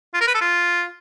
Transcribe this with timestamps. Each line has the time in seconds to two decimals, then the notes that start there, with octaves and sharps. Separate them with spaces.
0.14 F4
0.21 A#4
0.28 B4
0.35 A4
0.41 F4